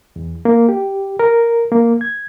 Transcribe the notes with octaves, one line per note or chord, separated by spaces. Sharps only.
E2
A#3
G4
A#4
A#3
G#6